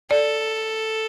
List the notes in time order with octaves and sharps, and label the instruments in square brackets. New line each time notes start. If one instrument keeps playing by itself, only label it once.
[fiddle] A4 [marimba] D5